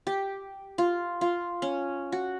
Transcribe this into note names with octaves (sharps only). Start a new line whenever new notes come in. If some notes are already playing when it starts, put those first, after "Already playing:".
G4
F4
F4
C#4
F#4